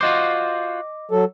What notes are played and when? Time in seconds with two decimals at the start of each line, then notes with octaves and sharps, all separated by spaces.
0.01 F4 F#4 C5 D#5 D6
1.11 F#3 A4